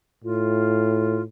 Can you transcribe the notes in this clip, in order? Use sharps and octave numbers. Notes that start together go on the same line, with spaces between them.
A2 F4